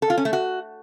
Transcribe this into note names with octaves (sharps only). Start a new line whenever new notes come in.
A4
F4
C#4
A3
F#4